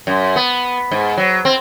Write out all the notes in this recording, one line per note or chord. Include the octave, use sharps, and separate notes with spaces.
F#2
B3
G#2
F#3
C4